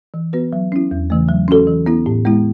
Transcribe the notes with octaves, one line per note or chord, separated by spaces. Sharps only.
E3
B3 F#4 B4
F#3
C#4 E4
E2
C#3 E3 A3
F#3
C#4 F#4 A4
E3
B3 E4
A2
G#3 B3 E4